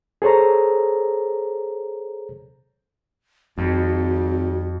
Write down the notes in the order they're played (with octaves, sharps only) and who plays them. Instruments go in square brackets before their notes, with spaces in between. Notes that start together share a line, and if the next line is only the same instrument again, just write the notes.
[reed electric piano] G#4 A4 C5 C#5 A#5
[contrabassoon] G#1 [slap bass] F2 [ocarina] F#4